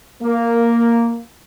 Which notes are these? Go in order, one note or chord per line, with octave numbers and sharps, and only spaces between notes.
A#3